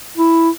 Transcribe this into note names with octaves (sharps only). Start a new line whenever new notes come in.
E4